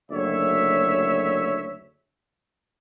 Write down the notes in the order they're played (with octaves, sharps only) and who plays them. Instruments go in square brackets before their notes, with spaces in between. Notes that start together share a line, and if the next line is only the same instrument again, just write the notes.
[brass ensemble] F#1 D2 C#5 E5